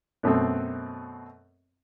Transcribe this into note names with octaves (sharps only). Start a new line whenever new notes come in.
F#2 B2 A3 C4